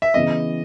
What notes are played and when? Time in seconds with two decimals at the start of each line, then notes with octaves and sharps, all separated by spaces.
0.02 E5
0.14 C#3 E3 B3 E4 D#5